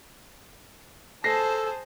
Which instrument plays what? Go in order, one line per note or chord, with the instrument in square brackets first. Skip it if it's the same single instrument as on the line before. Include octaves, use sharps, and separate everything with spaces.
[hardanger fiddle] G#4 C5 [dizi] A4 [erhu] A5 [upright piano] A#6 C7